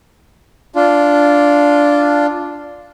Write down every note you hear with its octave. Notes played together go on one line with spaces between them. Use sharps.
D4 F4